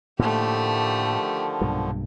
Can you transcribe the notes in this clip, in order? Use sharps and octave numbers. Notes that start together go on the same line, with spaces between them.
A2 D3 D#3 F3 A3 A#3 G4
B1 G2 A#2